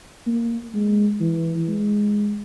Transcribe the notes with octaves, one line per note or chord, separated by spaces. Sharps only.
A#3
G#3
E3
G#3